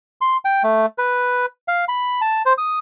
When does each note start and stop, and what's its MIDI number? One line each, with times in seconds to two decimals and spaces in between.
0.21 0.37 84
0.45 0.63 79
0.64 0.86 57
0.98 1.46 71
1.68 1.85 77
1.88 2.21 83
2.21 2.42 81
2.46 2.53 72
2.58 2.79 87